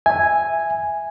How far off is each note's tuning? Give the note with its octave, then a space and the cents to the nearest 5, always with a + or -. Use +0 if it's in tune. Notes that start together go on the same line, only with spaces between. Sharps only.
E5 +0 G#5 -5